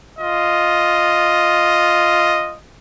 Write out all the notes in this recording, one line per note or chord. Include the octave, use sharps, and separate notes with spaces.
F4 D#5